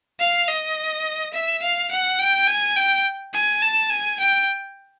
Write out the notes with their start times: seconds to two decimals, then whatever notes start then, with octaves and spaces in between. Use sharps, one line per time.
0.20 F5
0.49 D#5
1.34 E5
1.62 F5
1.91 F#5
2.19 G5
2.47 G#5
2.76 G5
3.34 G#5
3.62 A5
3.90 G#5
4.20 G5